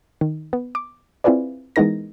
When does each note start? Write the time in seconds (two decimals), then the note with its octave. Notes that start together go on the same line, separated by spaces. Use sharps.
0.21 D#3
0.53 B3
0.75 D6
1.24 C4 E4 F4 G#4 B4 D5
1.76 E3 G#3 B3 D#4 A#4 A#6